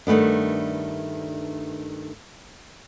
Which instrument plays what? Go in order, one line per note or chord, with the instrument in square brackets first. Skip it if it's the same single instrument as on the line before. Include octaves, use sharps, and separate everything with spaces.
[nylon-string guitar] G2 D#3 A3 B3 D4